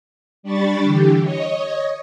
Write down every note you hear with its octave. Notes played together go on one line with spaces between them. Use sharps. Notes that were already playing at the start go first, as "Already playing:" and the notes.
G3 D4 B5 C#6 A6
D3 E3 G4
C#5 D#5